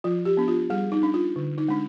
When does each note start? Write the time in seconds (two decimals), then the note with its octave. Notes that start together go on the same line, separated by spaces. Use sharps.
0.04 F3 F4
0.25 G4
0.37 B3 D4
0.48 F4
0.70 G3 G#4
0.92 D#4
1.03 D4
1.14 F4
1.36 D3
1.58 D#4
1.68 G#3 D4